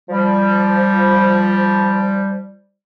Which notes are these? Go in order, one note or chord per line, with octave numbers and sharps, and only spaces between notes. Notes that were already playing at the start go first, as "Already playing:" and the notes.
F3 G3